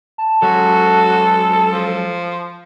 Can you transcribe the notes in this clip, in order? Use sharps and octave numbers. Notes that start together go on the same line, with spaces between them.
A5
F#3 G#3 C#4 F#4 A4
F3